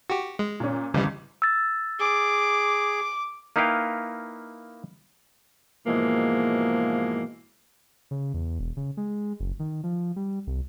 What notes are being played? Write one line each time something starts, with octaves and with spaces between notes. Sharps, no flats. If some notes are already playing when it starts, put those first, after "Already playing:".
F#4 G4
G#3
A#2 C#4
G#1 C#2 C#3 E3 G3
E6 A6
G#4 D6
A#3 D#4 E4 B4 F5 G5
G#2 B2 E3 F3 G#3 A#3
C#3
E2
E1
C#3
G#3
F#1
D#3
F3
G3
C2